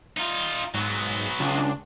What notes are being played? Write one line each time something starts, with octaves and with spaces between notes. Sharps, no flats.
D#4 F4
G#2 F#3 B3
C#2 D4